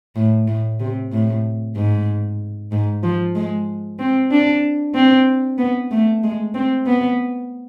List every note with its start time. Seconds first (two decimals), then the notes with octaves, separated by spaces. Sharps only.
0.16 A2
0.48 A2
0.80 C3
1.12 A2
1.76 G#2
2.72 G#2
3.04 F3
3.35 G#3
3.99 C4
4.31 D4
4.95 C4
5.58 B3
5.91 A3
6.23 G#3
6.54 C4
6.86 B3